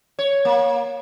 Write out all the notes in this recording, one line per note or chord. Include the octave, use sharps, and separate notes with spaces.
C#5
A#3